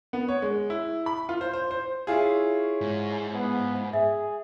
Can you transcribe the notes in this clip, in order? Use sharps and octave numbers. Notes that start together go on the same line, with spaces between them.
B3
C#5
G#3
E4
B5
F4
C5
C5
C5
E4 F4 G#4 C#5
G#2
B3
G#4 E5